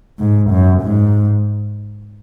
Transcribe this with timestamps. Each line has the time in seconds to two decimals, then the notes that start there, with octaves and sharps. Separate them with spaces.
0.20 G#2
0.51 F#2
0.83 G#2